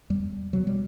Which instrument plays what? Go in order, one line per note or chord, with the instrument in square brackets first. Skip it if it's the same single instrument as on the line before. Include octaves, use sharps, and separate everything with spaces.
[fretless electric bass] E2 G3
B2 F#3
G3